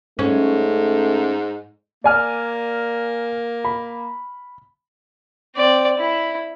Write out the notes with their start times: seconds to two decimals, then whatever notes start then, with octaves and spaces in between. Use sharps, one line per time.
0.19 G#2 A3 C#4
2.04 A#3 D5 G#5 F6
3.65 B5
5.55 C4 D5
5.98 E4